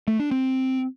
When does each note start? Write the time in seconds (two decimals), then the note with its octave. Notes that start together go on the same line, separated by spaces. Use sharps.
0.08 A3
0.19 D4
0.31 C4